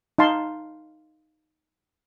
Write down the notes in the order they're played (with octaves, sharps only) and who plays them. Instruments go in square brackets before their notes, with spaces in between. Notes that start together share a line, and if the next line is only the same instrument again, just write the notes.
[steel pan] D#4 F5 A5 C6